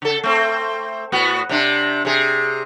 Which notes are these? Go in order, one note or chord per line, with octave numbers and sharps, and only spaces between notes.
C#3 A4
A3 C4
A2 B3 F#4
C3 D4
C3 G#4